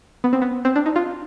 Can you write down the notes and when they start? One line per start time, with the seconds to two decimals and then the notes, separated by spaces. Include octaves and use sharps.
0.24 B3
0.33 C4
0.42 B3
0.65 C4
0.76 D4
0.86 D#4
0.96 F4